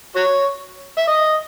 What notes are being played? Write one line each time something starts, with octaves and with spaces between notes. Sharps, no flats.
F#4 C#5
E5
D#5